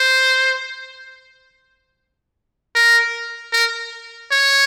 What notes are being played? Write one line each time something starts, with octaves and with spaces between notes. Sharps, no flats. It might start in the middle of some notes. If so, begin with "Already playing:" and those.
Already playing: C5
A#4
A#4
C#5